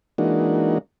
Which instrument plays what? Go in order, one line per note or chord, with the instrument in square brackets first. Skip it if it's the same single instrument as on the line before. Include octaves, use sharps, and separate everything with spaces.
[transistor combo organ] E3 G#3 A#3 D4 D#4 F#4